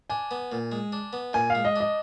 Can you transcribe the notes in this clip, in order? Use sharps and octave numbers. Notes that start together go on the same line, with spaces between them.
D4 G#5
B3
A#2
G#3
D4
B3
A#2 G#5
F5
G#3
D#5
D4 D#5